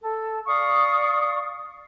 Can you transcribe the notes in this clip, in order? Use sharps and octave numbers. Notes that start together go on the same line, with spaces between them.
A4
D5 F5 C#6 D#6